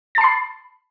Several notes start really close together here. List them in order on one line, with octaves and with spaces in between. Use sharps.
A6 A5 C7 B5